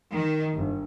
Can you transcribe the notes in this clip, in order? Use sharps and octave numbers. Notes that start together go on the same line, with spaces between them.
D#3
G1